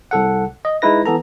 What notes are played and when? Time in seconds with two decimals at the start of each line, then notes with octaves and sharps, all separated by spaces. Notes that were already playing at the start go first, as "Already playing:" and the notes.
0.11 C2 A4 F#5
0.65 D#5
0.82 G#3 D#4 E4 B4 A#6
1.06 E3 B3 A4 A#5